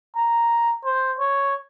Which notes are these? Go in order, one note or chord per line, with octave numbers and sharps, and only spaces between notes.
A#5
C5
C#5